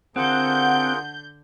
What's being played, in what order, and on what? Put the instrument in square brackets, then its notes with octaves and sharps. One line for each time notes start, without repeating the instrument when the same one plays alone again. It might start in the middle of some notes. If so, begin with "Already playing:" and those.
[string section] D3 G6 [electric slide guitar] C4 [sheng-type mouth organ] F4 G#4 A#4 [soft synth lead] F#5